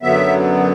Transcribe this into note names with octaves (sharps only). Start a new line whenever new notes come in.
F#2 D3 F#3 B3 E5